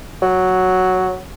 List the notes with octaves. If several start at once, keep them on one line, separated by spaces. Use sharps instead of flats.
F#3